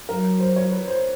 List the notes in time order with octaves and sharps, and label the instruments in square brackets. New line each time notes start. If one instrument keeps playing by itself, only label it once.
[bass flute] F#3 [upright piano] A#4
[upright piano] C5
C#5
B4
C5